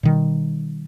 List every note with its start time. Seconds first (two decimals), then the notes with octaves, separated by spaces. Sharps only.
0.03 B2 D#3 G3